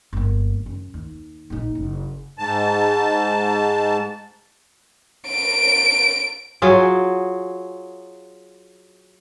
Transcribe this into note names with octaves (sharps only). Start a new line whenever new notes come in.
G1 A#3
F#2
D#2
A#1 D#4
F#1
G#2 A5
D7
F#3 F4 G#4